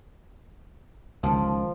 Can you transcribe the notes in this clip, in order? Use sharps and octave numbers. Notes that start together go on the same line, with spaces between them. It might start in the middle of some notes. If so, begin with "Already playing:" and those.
C#2 D#3 F3